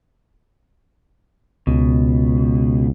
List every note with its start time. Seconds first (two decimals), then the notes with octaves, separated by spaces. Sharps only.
1.67 C#2 B2